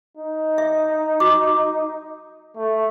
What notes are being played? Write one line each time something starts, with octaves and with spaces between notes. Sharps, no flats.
D#4
E5
F#4 D6
A3